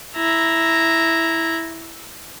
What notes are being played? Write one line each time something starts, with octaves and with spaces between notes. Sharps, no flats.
E4 A#5